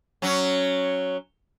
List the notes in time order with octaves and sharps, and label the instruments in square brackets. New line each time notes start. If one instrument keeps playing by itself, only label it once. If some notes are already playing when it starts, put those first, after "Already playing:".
[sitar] F#3 C#4